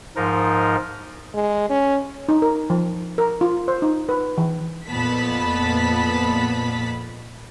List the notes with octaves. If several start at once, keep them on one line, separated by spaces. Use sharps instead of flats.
G#2 F3 D#4 A#4
G#3
C#4
D#4
A#4
F3
A#4
F4
C5
D#4
B4
E3
F2 A#2 B3 A5 B5 B6